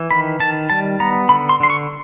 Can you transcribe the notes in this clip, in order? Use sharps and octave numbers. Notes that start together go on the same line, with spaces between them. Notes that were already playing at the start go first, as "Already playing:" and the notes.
Already playing: E3
D#3 B5
D#3 A5
G3 A5
B3 A#5
D3 B5
C6
D3 C6
C#6